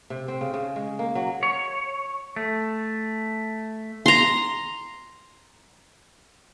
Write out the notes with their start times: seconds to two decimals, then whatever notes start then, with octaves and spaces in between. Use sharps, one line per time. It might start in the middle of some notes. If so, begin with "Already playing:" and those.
0.10 C3
0.28 C4
0.41 C#3
0.54 C#3
0.76 G#3
0.99 A#3
1.15 F#3
1.43 C#5
2.36 A3
4.06 A#5 C6